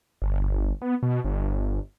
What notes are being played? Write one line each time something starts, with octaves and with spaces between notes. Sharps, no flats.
G1
B3
B2
G1